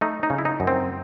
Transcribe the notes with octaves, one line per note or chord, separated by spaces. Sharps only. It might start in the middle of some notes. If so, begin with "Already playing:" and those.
A3 D#4
D#4
C#3
E4
D#4
F#2
C4